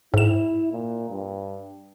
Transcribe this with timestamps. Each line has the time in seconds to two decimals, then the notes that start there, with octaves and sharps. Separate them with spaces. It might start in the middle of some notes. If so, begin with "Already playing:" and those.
0.14 G#2 E4 E7
0.72 A#2
1.09 G2